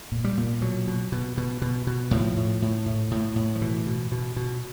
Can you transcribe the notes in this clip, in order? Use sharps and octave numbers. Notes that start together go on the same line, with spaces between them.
A#2
G3
A#2
B2 F#3
B2
B2
B2
B2
B2
A2 F3
A2
A2
A2
A2
A2
F3
B2 E3
B2
B2
B2